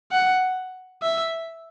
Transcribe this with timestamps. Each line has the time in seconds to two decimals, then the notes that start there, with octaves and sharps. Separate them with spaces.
0.12 F#5
1.02 E5